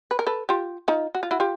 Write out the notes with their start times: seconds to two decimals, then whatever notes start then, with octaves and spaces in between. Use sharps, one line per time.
0.11 B4
0.19 A#4
0.27 A4 B4
0.49 F4 G4
0.88 D#4 F4
1.15 F#4
1.23 F4
1.31 E4 F#4
1.40 F4 G4